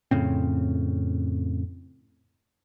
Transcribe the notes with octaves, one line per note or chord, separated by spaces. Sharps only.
F2 A2 C#3 C4